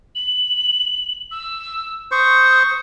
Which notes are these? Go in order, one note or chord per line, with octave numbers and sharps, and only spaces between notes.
F#7
E6
C5 C#6 D#6